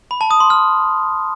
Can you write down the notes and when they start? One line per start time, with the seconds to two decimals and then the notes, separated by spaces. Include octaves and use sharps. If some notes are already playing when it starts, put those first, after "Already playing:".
0.11 B5
0.21 A5
0.31 D#6
0.40 C6
0.50 F6